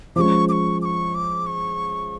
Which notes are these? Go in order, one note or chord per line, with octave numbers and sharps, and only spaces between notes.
F3 G#3 C#4 C#6 D6
D6
C#6
D6
C#6
D6
C#6